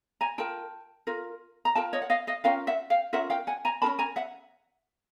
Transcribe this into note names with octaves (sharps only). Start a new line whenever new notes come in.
G#5 A#5
F4 A#4 G5 A5
F4 A#4
A#5
F4 A#4 G5 A5
C#5 D#5
F#5
D#5 F5
D#5 F5
C#4 F4 A#4 F5 G5
E5 F#5
F5 G5
C#4 F4 A#4 E5 F#5
F5 G5
F#5 G#5
G#5 A#5
C#4 F4 A#4 A5 B5
G#5 A#5
E5 F#5